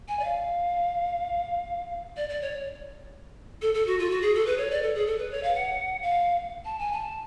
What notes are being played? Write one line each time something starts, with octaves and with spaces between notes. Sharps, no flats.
G#5
D5
F5
D5
D5
C#5
A4
A4
F#4
F4
F#4
G#4
A4
B4
C#5
D5
A4
G#4
A4
B4
C#5
F5
F#5
F5
A5
G#5
A5